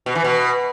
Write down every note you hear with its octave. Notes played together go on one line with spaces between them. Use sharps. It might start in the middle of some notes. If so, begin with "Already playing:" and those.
B2
E3
B2